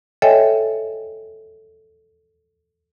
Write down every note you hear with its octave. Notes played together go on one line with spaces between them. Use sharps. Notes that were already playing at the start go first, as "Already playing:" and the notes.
A4 C#5 D#5 E5 G5 G#5